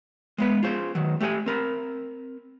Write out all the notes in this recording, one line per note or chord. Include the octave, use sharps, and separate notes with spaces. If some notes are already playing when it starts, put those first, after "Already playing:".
G#3 B3 B4
F4 G#4 C5
D#3 F#3
A3 G4 A4 D5 G#5
C4 A#4 B5